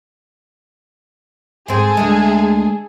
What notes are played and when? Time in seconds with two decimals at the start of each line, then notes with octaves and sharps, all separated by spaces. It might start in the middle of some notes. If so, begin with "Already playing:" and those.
1.68 G#2 C4 G#4 A4
1.97 D2 G#3